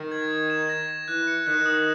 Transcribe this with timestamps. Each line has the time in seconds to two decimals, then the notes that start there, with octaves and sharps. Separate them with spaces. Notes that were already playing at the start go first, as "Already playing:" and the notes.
Already playing: D#3
0.11 G#6
0.31 G#6
0.50 E7
0.69 A#6
0.89 E7
1.08 E3 F#6
1.27 C#7
1.46 D#3 F#6
1.66 D#6